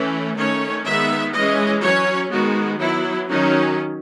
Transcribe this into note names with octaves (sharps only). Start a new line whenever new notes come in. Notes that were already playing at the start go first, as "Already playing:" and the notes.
Already playing: E3 A3 C#4
D#3 A3 C#4 C#5
D#3 G#3 B3 E5
E3 G#3 C#4 D#5
F#3 C#4 C#5
D#3 G#3 B3 F#4
F#3 B3 E4
D#3 F#3 C#4 D#4